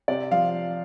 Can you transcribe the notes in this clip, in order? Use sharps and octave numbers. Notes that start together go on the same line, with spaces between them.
C3 D5
F3 F5